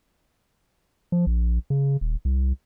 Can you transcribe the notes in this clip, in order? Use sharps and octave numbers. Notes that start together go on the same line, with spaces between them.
F3
A#1
C#3
D#1
C2